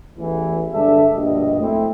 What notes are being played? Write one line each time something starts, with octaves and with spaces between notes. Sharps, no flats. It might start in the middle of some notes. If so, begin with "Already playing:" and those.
A1 E2 E3
G2 D3 G#3 A4 D5 E5
A#1 G2 B2 G3 D#5
A3 C4 E4